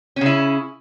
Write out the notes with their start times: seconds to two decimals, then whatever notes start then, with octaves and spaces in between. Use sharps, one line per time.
0.16 C#4
0.21 C#3
0.26 E4